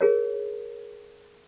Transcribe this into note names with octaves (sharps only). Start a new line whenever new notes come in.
G#4 A#4 C#5